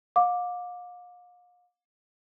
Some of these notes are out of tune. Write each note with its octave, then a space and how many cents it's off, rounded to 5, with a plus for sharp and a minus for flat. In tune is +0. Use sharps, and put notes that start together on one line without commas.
F5 +40 D6 +0